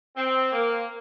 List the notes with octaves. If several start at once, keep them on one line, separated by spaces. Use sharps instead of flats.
C4
A#3